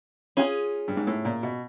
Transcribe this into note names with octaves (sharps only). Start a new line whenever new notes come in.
C#4 F4 G#4
G2
G#2
A2
A#2
B2